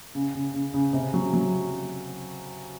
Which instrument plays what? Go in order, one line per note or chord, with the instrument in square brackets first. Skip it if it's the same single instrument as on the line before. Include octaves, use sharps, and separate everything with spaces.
[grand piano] C#3
C#3
C#3
C#3
C3
F#3
F#3